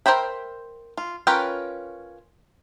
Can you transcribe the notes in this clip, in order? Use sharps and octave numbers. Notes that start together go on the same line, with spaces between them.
A#4 C5 E5 G5 B5
F4
C#4 F4 A#4 B4 G5